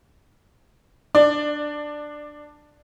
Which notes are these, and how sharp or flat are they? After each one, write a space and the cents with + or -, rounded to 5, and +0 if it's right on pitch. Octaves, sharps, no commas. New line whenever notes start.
D4 +10 D5 +25